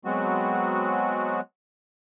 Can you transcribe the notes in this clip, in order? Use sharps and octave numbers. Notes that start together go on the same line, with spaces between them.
F#3 G#3 B3 C4 F#4